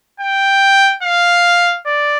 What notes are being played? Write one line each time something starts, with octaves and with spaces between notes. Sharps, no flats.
G5
F5
D5